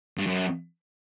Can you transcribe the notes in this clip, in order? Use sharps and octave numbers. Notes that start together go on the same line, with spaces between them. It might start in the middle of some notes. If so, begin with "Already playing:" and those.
G2
F#2